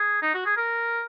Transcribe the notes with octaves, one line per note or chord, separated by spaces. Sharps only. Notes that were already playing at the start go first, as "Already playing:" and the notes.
Already playing: G#4
D#4
F#4
G#4
A#4